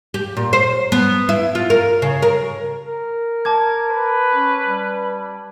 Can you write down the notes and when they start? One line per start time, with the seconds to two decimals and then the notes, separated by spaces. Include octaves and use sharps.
0.14 G4
0.37 A#2
0.53 C5
0.92 B3
1.29 E4
1.55 F4
1.70 A#4
2.02 C#3
2.22 A#4
2.86 A#4
3.45 A5 D6 G#6
3.91 B4
4.33 C#4
4.66 G3